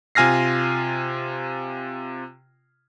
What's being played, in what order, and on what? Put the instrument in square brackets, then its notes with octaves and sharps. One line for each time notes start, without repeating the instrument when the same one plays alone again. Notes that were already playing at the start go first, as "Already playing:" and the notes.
[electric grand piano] C3 F4 G#5 F6 A#6 C7